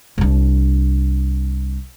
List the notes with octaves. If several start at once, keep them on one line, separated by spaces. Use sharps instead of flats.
C2 D4